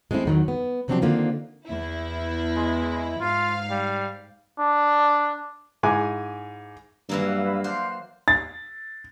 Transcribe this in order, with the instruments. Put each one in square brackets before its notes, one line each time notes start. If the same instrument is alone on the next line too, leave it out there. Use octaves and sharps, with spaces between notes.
[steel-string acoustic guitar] G#3 A3 C4 C#4 E4
E2 D#3 F#3
B3
C3 F3 F#3 C4 D4 G4
D3 D#3 A#3 C4 F4
[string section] E2 E4
[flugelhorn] G#3
[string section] G#2 F5 [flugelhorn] F4
[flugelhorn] G3
[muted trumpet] D4
[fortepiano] G#2 E4 G#5 D6
[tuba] G2 [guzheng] E3 F#3 A#3 [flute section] B4 F5 E6
[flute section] D4 F5 F#6 [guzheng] C5
[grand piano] A6